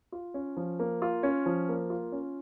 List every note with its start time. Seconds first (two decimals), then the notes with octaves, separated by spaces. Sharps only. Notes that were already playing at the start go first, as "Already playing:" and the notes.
0.12 F4
0.34 C#4
0.57 F3
0.79 A#3
1.02 F4
1.23 C#4
1.46 F3
1.69 A#3
1.90 F4
2.12 C#4